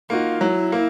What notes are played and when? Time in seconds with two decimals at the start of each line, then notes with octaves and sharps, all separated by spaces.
0.10 A#3 D#4 F4 F#4
0.41 F#3 E4
0.72 A#3